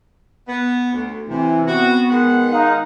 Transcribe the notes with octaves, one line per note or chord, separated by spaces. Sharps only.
B3
D2
C3 E3
B3 C4 F#4
D#3 G#3 F#5
D#4 F5